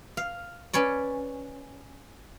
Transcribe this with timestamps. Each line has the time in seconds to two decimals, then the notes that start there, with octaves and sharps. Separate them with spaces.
0.17 F5
0.73 C#4 B4 C#5 D5